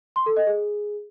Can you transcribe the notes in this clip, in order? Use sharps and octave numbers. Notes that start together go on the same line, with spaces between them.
C6
A4
D#5
G#4